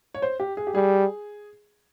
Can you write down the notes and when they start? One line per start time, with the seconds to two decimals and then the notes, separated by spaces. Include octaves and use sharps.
0.14 C#5
0.22 C5
0.40 G4
0.57 G#4
0.67 G4
0.74 G3 G#4